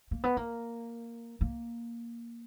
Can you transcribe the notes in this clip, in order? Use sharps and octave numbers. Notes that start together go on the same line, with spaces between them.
A#3
B3
A#3
A#3